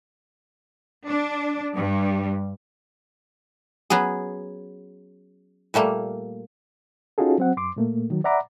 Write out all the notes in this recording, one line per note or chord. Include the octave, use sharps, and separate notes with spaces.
D4
G2
F#3 B3 C#4 G#4
A#2 G3 A3 A#3
C#4 D#4 F4 F#4 G#4 A4
F#3 C4 F#5
F#2 C6 D6
A#2 A3 A#3
D#3 F#3
D5 E5 F#5 A#5 B5 D6